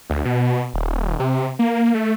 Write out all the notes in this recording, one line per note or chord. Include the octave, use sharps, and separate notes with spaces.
D2
B2
D#1
C3
A#3
A3